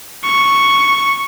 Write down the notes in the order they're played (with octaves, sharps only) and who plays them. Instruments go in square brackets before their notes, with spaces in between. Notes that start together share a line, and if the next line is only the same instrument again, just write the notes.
[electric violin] C#6